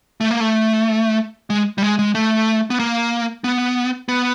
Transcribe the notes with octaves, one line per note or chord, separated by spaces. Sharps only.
A3
A#3
A3
G#3
G3
G#3
G#3
A3
B3
A#3
B3
B3